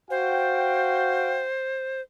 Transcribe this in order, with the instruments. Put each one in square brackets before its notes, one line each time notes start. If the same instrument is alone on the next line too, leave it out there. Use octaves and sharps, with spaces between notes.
[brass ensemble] F#4 F5 G5 [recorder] C5